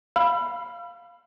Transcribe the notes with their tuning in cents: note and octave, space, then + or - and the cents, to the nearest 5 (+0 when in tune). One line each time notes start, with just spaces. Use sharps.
F5 +0 B5 +0 E6 +45